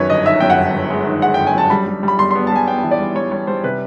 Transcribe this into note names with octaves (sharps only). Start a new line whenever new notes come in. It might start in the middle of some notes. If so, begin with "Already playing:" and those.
Already playing: F#2 D#3 B4 C#5
G1 D#5
D#3 E5
F#2 G5
F#5
G1
G1
G#3
D#3
G#3 F#5
G1 G5
G#5
F#2 A5
G3 B5
G3
G3
B5
G3 C6
B3 C6
A5
G3 G#5
B3 G5
E3
D5
G3
G3 C#5
G3 C#5
G3 C5
C3 B4